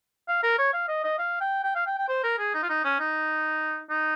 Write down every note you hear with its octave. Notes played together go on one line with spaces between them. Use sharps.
F5
A#4
C#5
F5
D#5
D#5
F5
G5
G5
F5
G5
G5
C5
A#4
G#4
D#4
F4
D#4
C#4
D#4
D#4